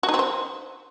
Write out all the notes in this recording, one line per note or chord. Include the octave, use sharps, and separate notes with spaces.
F#4
D#4
C4
C5